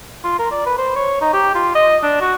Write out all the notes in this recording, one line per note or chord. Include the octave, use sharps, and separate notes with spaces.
F4
A#4
D5
B4
C5
C#5
D#4
G4
F4
D#5
D4
F#4